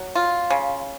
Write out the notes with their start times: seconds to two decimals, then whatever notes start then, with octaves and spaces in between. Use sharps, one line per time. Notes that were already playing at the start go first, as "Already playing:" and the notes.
Already playing: F#3
0.15 F4
0.50 C#3